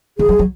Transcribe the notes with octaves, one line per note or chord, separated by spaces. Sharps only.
D#3 G#4
F#3
F#3